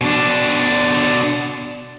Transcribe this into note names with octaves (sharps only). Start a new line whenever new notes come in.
B2 D4